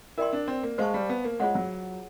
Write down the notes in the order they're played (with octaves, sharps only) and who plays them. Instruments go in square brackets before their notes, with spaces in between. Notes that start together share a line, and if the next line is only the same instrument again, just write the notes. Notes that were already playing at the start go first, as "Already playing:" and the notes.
[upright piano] E4 [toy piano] A#4 D5 G5 C6
[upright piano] D4
C4
A#3
[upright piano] G#3 [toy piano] C5 F5 A5 C#6
[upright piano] G3
B3
A#3
[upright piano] G#3 [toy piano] F4 G#4 C#5 F#5
[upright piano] F#3